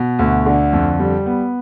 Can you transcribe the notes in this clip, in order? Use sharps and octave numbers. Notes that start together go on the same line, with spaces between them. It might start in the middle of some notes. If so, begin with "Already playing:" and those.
Already playing: B2
D2
D3
F2
G3
B3